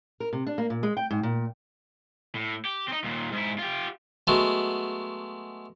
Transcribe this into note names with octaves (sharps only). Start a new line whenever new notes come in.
A#4
C3
D4
A#3
A#2
G#3
G5
G#2
A#2
A2
G4
C4 D#4
D#2 A#2
G#2 E4
F4 G4
F#3 G#3 A3 B3